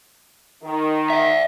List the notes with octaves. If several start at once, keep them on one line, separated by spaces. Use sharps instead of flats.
D#3
D5 E5